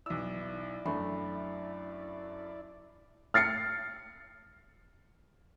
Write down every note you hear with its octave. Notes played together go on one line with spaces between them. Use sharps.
B1 E4 D5 E6
F#2 A3 D4 E5 B5
F6 A6 C7 C#7